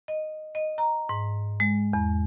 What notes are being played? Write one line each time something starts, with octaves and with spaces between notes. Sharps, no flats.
D#5
D#5
A#5
G#2
G#3
E2